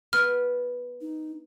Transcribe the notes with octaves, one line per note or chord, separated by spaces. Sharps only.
B3 F6
D#4